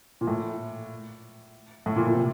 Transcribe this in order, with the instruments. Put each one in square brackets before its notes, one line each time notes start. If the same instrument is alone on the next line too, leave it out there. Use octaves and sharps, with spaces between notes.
[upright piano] A#2
A2
A2
A#2
A#2
C3